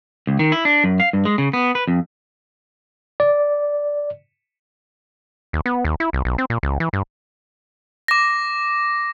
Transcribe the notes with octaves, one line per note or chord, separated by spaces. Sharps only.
C#2
D#3
E4
D4
F#2
F5
G2
G#3
C#3
B3
B4
F2
D5
D#2
B3
D#2
E4
C2
B1
C4
A#2
C#2
E3
G2
D6 A#6